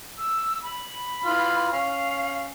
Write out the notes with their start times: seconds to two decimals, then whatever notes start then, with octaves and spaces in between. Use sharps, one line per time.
0.19 E6
0.63 B5
1.25 E3 F4 F6
1.72 C#4 F5